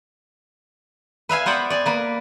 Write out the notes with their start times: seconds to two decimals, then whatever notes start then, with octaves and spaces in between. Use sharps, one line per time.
1.29 B4 E5 F5 G#5
1.46 B3 C5 D5 F#5 G5
1.70 D5 G#5
1.86 A#3 B4